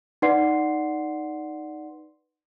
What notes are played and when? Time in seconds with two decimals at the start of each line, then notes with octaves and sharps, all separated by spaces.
0.22 D#4 B4 D5 F#5 C6 C7